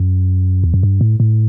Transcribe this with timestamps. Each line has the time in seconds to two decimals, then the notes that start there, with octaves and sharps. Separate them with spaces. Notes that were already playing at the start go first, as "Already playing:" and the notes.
Already playing: F#2
0.64 E2
0.74 F#2
0.83 G2
1.01 A2
1.20 A2